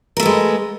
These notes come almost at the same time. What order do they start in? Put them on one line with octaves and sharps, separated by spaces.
A#4 A3 B3 G#3